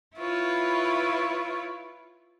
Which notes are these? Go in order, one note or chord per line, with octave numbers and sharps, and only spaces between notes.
E4 F4 B4 C#5